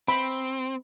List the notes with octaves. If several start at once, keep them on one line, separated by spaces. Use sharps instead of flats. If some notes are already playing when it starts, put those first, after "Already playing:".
C4 B5